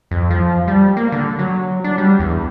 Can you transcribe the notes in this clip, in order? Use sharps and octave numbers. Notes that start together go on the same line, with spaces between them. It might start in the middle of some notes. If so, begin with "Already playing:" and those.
F2
F3
G3
A#3
D3
F#3
D4
G3
E2